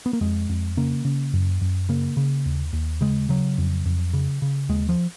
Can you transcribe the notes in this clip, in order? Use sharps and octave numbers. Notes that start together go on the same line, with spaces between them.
B3
A#3
F2 G#3
F2
C#3 A#3
C#3
F#2
F#2
C#3 A#3
C#3
D#2
D#2
C#3 G#3
C#3 F#3
F2
F2
C#3
C#3
D#2 G#3
F3